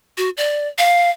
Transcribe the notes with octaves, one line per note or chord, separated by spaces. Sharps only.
F#4
D5
F5